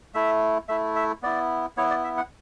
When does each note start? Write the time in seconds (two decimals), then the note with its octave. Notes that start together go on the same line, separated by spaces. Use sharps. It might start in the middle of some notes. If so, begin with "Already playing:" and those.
0.14 A3 E4 E5
0.69 A3 E4 E5
0.96 E5
1.23 B3 E4 D5
1.77 B3 E4 C#5
1.90 D5
2.04 E5
2.17 F#5